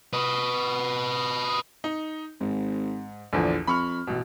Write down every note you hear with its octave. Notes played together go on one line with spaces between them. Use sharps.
B4 D#5
D#4
G#1 G#2
A#1 E2 D3 F3
F2 B5 C#6 F6
A1 B2